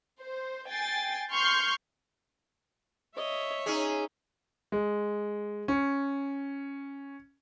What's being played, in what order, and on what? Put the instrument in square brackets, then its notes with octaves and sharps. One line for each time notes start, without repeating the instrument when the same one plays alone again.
[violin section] C5
G5 G#5 A6 C7
C6 C#6 F6 G6
[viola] C#5 E5 [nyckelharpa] D#5
[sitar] C#4 G#4 [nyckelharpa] D#4
[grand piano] G#3
C#4